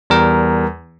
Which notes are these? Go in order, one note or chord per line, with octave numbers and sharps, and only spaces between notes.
E2 G3 A#4